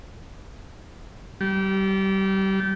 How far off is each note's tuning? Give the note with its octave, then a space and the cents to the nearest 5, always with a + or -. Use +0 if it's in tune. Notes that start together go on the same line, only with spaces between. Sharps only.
G3 -25